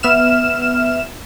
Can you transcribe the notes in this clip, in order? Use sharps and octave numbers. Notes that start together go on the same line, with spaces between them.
B3 E5 F6 E7